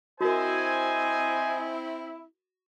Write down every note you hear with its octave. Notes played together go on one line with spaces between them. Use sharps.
C4 E4 F#4 A#4 C5 D#5 G#5